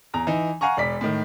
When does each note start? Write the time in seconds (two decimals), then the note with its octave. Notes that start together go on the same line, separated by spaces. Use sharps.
0.14 E2 A#5
0.27 E3 D#4
0.61 F5 F#5 G#5 A#5 C#6
0.77 E1 D5 B6
1.01 A2 D#3